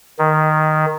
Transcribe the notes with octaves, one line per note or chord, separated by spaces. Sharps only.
D#3